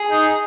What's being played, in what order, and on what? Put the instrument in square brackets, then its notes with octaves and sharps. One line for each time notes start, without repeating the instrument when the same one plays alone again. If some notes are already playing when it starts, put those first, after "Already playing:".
Already playing: [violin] G#4
[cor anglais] D#4